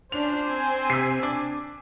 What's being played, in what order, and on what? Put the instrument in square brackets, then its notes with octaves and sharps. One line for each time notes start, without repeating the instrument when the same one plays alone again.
[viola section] C#4 D4 F4 [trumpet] C5 [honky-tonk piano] F7
[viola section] C4 G#5
[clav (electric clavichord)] C3 [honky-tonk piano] E6 B6 C7
[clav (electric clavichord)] D4 [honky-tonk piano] D6